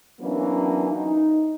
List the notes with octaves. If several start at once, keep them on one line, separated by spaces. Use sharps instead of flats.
E3 F#3 A#3 B3 C#4 D4
D#4